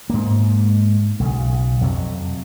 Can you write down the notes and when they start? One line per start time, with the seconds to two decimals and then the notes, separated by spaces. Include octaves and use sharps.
0.10 G#2 A#3
1.20 B1 C#3
1.81 F2 C3 F#3